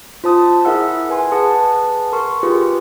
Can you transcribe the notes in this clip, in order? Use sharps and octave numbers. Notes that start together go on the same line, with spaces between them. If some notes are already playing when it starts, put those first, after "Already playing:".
F4 C5 A5 D#6
E4 G#4 A#4 E5 F#5 E6
B4 G#5 C6
G#4 B4 F#5 A5
A#4 C6 C#6
F4 G4 G#4 B4